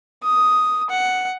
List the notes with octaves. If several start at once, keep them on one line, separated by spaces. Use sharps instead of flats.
D#6
F#5